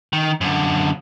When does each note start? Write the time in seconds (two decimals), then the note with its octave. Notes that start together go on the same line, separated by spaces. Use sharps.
0.13 D#3
0.41 F#2 D3